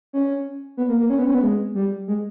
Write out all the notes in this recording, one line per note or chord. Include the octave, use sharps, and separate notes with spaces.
C#4
B3
A#3
A#3
C#4
B3
C#4
B3
G#3
G3
G#3